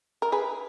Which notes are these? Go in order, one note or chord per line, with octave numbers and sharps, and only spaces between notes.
A#4
G#4 B4